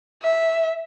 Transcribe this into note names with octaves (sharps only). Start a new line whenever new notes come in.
E5